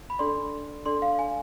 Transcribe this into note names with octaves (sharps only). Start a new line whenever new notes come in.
B5
D4 A4 D5 C6
D4 A4 D5 C6
F5
G#5